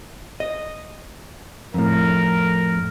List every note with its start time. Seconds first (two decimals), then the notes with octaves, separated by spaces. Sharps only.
0.40 D#5
1.74 F2 A2 A#4